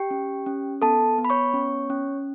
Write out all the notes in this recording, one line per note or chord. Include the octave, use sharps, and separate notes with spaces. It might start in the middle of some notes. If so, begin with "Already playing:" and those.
Already playing: G4 G5
C#4
C#4
B3 A4 A5
B3
B5
C#5 C#6
C#4
C#4